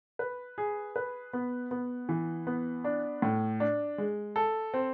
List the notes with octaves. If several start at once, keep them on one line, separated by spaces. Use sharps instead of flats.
B4
G#4
B4
B3
B3
E3
B3
D4
A2
D4
G#3
A4
C4